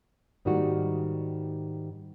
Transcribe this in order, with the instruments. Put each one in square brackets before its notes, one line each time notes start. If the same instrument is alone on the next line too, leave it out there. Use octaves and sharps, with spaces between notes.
[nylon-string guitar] G#2 D#3 G3 A#3 D#4 F#4